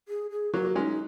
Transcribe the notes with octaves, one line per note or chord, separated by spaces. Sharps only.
G#4
G#4
F#3 A#3 F#4 G#4
A#3
G#3 C#4 D#4 F#4